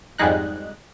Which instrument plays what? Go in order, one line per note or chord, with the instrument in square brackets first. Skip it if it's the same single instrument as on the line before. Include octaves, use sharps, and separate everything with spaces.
[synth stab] F2 G#2 G3 G#3 D#4 F#6